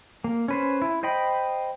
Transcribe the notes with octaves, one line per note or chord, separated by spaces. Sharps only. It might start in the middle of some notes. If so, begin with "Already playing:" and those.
A#3
C#4 B4 C5
E4
C5 D#5 G5 B5